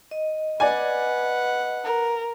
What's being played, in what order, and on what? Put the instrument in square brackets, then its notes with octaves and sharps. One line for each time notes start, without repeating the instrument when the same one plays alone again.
[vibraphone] D#5
[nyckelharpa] B4 F#5 [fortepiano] D5 G#5
[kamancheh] A#4